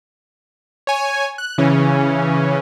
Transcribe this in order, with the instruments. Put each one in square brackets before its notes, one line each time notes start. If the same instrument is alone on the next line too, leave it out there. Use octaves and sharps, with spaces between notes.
[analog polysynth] C#5 G#5
F#6
C#3 E3 C#4